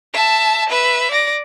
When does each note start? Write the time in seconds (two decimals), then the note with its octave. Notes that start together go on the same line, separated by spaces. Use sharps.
0.14 E5 A5
0.70 B4 E5
1.11 D5 A#6